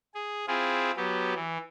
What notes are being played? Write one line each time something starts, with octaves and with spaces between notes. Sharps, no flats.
G#4
C4 E4 F4 G#4
F#3 B3 G4
E3